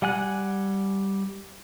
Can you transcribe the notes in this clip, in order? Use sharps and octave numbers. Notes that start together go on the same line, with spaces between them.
G3 F#5 G#5 F#6